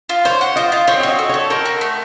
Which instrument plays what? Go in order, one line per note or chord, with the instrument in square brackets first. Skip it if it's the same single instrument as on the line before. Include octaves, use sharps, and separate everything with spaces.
[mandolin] F4
[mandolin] C5 [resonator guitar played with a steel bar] C#5
[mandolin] F#5
[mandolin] F4 [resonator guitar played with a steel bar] D#5
[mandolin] F4
[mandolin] C4 [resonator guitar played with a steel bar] C#5
[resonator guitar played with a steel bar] C#5
[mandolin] F#4
[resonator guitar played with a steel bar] D#5
[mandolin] A3
[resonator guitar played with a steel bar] C#5
[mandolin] A4
[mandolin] C4 [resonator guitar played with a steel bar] A#4
[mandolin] F#4
A3